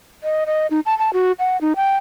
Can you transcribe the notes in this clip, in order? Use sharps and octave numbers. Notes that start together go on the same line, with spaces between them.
D#5
D#5
D#4
A5
A5
F#4
F#5
D#4
G5